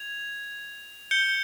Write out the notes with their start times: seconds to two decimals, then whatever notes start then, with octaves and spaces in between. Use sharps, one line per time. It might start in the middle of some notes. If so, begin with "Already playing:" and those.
Already playing: G#6 F7
1.11 G6 C#7 G7